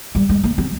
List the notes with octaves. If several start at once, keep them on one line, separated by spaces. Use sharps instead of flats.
G3
G#3
A#3
C4